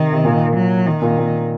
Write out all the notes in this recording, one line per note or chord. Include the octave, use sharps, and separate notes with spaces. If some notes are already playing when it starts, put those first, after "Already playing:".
Already playing: C3 D#3
C3
A#2
F#3
D#3
A#2
A#2